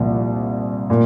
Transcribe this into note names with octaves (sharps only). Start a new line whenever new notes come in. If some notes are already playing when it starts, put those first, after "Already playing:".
Already playing: C2 A#2 F3
A#2